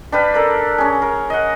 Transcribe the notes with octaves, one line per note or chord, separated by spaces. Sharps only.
D4 G4 B4 F5
A4 A#4 D5
C#4 G#4
A#4
D#5 F#5